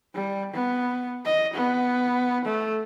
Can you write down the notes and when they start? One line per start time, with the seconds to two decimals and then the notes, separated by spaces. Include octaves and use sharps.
0.15 G3
0.54 B3
1.25 D#5
1.54 B3
2.45 A3